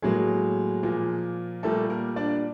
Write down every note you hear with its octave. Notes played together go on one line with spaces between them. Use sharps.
A2 F#3 G#3 A#3 G#4
A#2 F3 A#3
A#2 G3 A3 A#3 A4
A#3 A#4
D4 D5